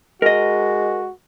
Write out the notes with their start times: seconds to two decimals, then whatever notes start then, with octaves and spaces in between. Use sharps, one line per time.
0.22 G#3 F#4 A#4 D#5